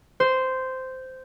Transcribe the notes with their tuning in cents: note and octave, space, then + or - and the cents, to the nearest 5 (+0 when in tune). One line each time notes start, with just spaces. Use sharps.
C5 -10